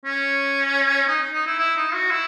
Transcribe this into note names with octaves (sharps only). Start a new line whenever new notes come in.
C#4
D#4
D#4
E4
E4
D#4
F#4
E4